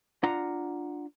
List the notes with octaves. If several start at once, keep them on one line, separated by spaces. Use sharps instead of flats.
D4 F4 F#5 A#5